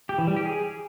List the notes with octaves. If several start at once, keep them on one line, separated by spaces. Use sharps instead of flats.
G4
E3
G3
G4
G#4